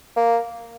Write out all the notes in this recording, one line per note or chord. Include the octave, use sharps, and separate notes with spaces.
A#3